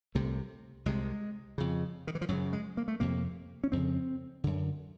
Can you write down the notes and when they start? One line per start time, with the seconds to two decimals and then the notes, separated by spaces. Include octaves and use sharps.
0.15 C2 C3 A3
0.86 C2 C3 G#3
1.58 F2 C#3
2.07 D#3
2.15 E3
2.21 F3
2.29 F#2 F#3
2.32 C#3
2.53 G#3
2.77 A#3
2.88 A3
3.00 F2 C3 A#3
3.64 C#4
3.72 F2 C#3 C4
4.44 F#2 D3